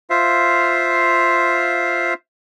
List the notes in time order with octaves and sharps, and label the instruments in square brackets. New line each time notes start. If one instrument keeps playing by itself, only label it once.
[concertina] F4 C5 E5 F5